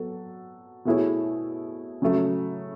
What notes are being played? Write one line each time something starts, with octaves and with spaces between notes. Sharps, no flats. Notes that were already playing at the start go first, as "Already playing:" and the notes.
Already playing: F#3 B3 F#4 A4
B2 A3 E4 G#4 C#5
C#3 F#3 A3